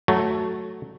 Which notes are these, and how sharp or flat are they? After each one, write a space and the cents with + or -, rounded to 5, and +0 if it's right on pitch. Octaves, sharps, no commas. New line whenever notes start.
F#3 +0 A3 +0